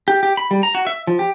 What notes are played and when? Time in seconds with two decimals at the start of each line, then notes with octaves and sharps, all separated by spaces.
0.08 G4
0.23 G4
0.37 B5
0.51 G3
0.63 A#5
0.75 F#4
0.87 E5
1.07 F3
1.19 G4